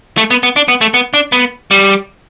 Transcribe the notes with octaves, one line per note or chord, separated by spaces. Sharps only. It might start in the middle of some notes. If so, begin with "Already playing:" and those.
A3
B3
B3
D4
B3
A3
B3
D4
B3
G3